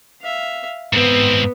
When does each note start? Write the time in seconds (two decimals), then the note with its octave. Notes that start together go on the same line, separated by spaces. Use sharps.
0.22 E5 F5
0.93 G#2 B3 C4